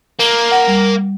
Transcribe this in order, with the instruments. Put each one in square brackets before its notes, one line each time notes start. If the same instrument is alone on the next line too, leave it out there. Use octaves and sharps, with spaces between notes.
[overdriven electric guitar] A#3
[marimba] F#5
G3